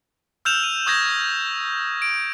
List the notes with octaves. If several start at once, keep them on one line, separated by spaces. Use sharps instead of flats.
E6 F6 G6 E7 F7
D#7
C#6 D#6 G6 G#6 A#6
D7